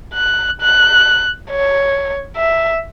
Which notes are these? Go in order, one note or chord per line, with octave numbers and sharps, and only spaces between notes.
F#6
F#6
C#5
E5